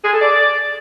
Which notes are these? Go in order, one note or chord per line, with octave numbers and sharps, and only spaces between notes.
G#4
A4
D5